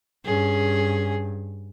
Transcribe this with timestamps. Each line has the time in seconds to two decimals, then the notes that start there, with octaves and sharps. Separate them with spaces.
0.25 G2 C#4 G#4